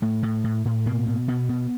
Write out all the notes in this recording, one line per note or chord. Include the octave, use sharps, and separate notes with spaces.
A2 A3
A2
A2
A2
B2 A#3
B2
B2 B3
B2